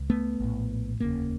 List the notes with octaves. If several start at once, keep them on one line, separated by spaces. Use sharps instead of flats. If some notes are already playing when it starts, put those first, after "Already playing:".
Already playing: C#2
A3 B3
A#1 A2
F1 D#2 C#3 A#3